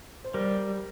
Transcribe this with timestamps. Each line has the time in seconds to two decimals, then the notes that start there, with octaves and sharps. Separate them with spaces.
0.24 C5
0.34 G3 A#4